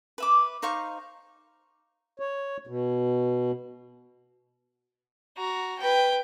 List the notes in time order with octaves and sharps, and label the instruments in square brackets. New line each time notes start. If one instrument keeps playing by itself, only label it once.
[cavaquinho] B4 E5 D6
D#4 C5 F5 C#6
[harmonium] C#5
B2
[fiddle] F#4 A#5
B4 G5